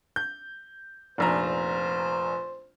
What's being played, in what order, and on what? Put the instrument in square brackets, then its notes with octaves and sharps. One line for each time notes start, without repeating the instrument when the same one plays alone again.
[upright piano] G6
[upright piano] F1 A#1 A#5 [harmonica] C5